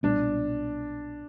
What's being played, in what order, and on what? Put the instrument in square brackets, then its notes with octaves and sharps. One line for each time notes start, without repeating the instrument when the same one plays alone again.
[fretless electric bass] B1 A#2 G3 B3 [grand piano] D4